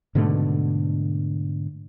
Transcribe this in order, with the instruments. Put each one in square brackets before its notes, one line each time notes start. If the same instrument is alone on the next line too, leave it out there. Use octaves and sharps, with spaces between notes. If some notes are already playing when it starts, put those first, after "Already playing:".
[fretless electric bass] G#2 B2 D3 A3